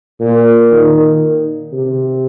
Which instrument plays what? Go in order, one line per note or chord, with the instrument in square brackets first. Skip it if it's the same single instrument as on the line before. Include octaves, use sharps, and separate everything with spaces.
[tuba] A#2
D#3
C3